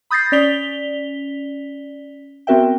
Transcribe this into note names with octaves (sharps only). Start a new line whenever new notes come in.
B5 D#6 G6 A6 A#6 C7
C#4 D5 B6 F7 G7
B3 C4 F#4 A#4 E5 G5